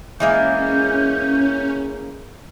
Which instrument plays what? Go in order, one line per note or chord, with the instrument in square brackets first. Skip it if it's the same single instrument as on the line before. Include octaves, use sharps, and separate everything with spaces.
[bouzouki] E3 G#3 A#3 [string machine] C#4 [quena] G6